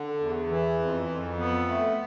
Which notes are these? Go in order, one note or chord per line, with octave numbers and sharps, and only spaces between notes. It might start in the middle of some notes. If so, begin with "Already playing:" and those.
Already playing: D3
E2
E3
F2
F2
B3
A3